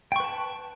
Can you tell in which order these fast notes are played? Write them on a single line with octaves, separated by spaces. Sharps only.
G5 C#6 B4 A5